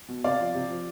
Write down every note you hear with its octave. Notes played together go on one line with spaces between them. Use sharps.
B2
C3 D5 F5
F3
C3
F3